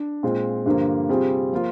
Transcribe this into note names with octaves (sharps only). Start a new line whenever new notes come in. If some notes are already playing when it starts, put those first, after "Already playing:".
Already playing: D4
A#2 G#3 C4 F4
G2 D3 F3 A#3
C3 G3 C4 F4 G#4
F3 A#3 F4